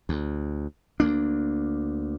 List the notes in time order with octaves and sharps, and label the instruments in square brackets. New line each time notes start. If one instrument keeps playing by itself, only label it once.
[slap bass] D2
D2 A#3 D4